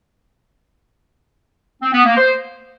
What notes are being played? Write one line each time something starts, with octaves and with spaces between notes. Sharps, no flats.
C4
B3
A#3
C5